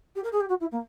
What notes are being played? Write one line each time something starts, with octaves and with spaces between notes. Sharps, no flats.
G4
A#4
G#4
G4
F#4
E4
A#3